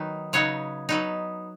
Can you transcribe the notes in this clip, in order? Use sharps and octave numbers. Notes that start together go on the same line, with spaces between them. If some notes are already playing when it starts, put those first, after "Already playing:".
Already playing: D#3 F#3 B3 D#4
C#3 F#3 B3 D#4 C#5
F#3 B3 D#4